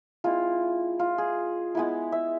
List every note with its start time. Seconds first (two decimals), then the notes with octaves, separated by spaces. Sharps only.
0.24 G#3 C4 E4 F4
0.99 F4
1.18 G#4
1.75 G#3 B3 E4
2.12 E5